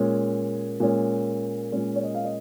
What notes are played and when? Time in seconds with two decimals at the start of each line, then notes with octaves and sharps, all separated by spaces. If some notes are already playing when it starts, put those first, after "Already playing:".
Already playing: A#2 G#3 C#4
0.80 A#2 G#3 C#4
1.72 A#2 G#3 C#4 C#5
1.96 C#5
2.03 D#5
2.14 F5
2.24 D#5